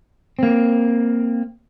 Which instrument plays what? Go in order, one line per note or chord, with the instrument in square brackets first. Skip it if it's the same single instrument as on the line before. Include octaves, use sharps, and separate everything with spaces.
[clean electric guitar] A#3 C4